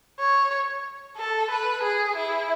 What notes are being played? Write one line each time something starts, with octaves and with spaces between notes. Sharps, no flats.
C#5
A4
B4
G#4
E4